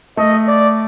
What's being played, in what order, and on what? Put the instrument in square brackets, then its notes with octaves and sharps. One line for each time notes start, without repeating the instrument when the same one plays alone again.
[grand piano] A3 [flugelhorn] D#5
[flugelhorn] D5